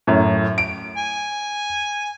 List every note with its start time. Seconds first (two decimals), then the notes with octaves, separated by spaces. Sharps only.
0.07 F#2 A2
0.58 D7
0.98 G#5